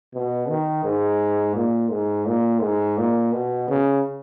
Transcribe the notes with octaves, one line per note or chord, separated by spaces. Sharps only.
B2
D#3
G#2
A#2
G#2
A#2
G#2
A#2
B2
C#3